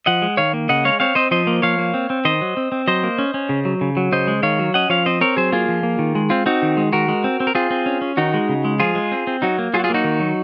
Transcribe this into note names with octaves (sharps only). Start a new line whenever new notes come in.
F3 D#5 F#5
G#3
D#3 C#5 F5
A#3
C#3 D#5 F#5
G#3 C#5 F5
C4 C#5 F5
C4 C5 D#5
F3 C5 D#5
A#3
F3 C#5 F5
A#3
C4
C4
D#3 C5 D#5
F#3
C4
C4
F#3 C5 D#5
A#3
C#4
C#4
C#3
F#3
C#3
F#3
C#3 C5 D#5
G#3
D#3 C#5 F5
F#3
C#4 D#5 F#5
F3 C#5 F5
C4 C5 D#5
C4 A#4 C#5
F#3 G#4 C5
A#3 F4 G#4
F3
A#3
D#3
G#3
C4 F4
C4 D#4 F#4
D#3
G#3
D#3 F#4 A#4
G#3
C4
C4
A#4
C4 F4 G#4
C4
C#4
C#4
D#3 D#4 F#4
G#3
C#3
G#3
F3 F4 G#4
G#3
C4
C4
F#3 D#4 F#4
A#3
F#3 F4 G#4
F#4
F4 G#4
A#3 D#4 F#4
D#3
F#3